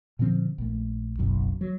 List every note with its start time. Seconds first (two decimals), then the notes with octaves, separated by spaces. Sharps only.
0.19 A#2 D3 F3 C4
0.58 A#1 A3
1.19 F#1 B1 F#2
1.61 F#3